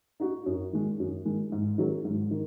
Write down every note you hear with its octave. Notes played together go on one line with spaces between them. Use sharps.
D#4 F#4
F#2
D#3 G#3
F#2
D#3 G#3
G#2
D#3 F#3 C#4 G#4
G#2
D#3